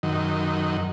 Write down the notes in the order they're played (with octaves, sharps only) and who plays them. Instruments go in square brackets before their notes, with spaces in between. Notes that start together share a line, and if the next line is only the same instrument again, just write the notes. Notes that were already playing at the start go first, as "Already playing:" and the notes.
[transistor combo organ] F#2 D#3